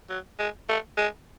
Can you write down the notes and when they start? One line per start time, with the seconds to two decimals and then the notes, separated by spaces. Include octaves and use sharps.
0.10 F#3
0.39 G#3
0.69 A3
0.98 G#3